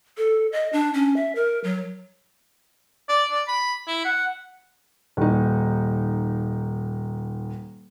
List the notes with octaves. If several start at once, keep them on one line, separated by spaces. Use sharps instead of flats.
A4
D#5
D4
C#4
E5
A#4
F#3
D5
D5
B5
E4
F#5
D#1 D#4